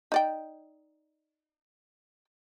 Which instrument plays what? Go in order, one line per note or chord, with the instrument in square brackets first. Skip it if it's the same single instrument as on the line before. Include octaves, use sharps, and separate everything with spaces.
[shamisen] D#4 D5 G5